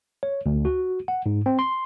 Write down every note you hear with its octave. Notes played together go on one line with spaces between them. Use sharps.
C#5
D2
F#4
F#5
G#2
C4
C6